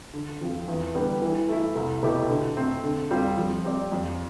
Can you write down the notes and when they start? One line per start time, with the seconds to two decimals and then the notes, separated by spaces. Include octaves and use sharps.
0.13 D3
0.41 F3 C4 F4
0.68 E2
0.95 D3 G3 B3
1.22 E3
1.49 A3 E4
1.75 C2
2.03 B2 A3 E4 G4
2.29 D3
2.57 A3 C4
2.84 D3
3.11 G3 C4 F4
3.37 F3
3.64 C4 G4 D5
3.92 F2